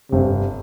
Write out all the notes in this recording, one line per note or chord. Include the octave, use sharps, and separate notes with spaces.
G1 C3